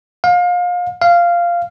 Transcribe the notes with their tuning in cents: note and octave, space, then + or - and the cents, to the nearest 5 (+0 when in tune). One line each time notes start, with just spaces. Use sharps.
F5 +30
F5 -10